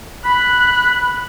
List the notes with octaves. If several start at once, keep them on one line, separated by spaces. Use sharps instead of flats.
B5 F#6